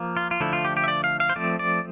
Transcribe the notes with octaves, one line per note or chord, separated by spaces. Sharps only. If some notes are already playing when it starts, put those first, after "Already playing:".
Already playing: F3 A#3
F4
F4
D3 F3 A3 E4
F4
G4
G4
E5
D5
F5
F5
C5
F3 A3 C4 D5
D5